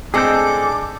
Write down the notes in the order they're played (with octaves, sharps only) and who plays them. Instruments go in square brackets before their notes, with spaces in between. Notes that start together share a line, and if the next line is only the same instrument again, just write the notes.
[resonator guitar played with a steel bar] A2 G#3 C4 [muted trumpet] D4 [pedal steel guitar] G#4 A4 G6 [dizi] D6